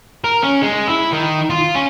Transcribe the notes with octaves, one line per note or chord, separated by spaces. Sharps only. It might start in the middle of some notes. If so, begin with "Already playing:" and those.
A#4
C#4
G#3
E4
D#3
F4
C#4